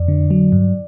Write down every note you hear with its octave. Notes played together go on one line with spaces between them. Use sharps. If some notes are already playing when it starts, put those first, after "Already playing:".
Already playing: F2 D5
D3
F#3
G2